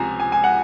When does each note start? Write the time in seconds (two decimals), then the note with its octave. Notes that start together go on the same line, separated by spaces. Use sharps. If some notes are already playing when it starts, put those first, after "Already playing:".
Already playing: C#2 C3 F3 G#5 A#5
0.20 G#5
0.32 G#5
0.44 F#5